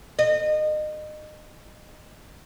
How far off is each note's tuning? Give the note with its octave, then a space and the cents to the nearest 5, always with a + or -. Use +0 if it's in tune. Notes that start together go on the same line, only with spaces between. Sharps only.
D#5 -30